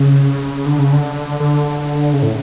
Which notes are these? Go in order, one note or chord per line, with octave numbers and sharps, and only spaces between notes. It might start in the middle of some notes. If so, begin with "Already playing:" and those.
Already playing: C#3
D3
C#3
D3
D3
C#3
A2